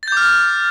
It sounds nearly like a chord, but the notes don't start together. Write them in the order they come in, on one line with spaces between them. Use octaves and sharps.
A6 G6 D6 F6